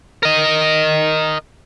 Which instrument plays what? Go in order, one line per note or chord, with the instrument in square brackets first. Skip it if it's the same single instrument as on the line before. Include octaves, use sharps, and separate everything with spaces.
[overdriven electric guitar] A#4 D#5